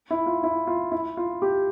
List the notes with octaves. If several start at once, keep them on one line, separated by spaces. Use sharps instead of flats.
E4
F4
E4
F4
E4
F4
G4